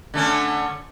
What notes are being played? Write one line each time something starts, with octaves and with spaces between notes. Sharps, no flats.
D3 A3 C#4